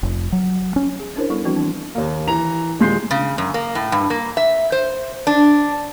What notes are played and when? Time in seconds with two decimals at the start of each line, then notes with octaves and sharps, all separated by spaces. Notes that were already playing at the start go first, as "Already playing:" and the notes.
0.03 F1
0.32 F#3
0.76 C#4
1.00 G#4
1.16 C#4 D4 E4 A#4 C5 C#5
1.30 G3 B3 E4 A4 C#6
1.45 E3 F3 G3 C4 D4 F#4
1.56 E3 D4
1.95 D#2 A#3
2.28 E3 A#5 F7
2.79 D#1 A#2 G#3 C6 G6 C7
3.11 C#3
3.38 F#2
3.54 A#3
3.75 A2
3.92 G2
4.10 A#3
4.37 E5
4.72 C5
5.27 D4